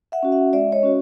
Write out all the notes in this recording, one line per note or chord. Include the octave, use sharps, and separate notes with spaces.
E5 F#5
C#4 F#4
E5 F#5
G#3 D5 E5
C#5 D#5
C#4 F#4